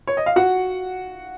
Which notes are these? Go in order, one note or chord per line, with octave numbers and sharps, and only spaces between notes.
C#5
D#5
F5
F#4 F#5